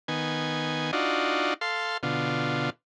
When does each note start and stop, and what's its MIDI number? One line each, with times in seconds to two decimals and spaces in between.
0.08 0.91 51
0.08 0.91 59
0.08 0.91 80
0.93 1.54 62
0.93 1.54 63
0.93 1.54 65
0.93 1.54 66
1.61 1.97 69
1.61 1.97 77
1.61 1.97 84
2.03 2.70 47
2.03 2.70 50
2.03 2.70 65